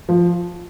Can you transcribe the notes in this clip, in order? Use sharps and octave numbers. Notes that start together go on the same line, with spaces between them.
F3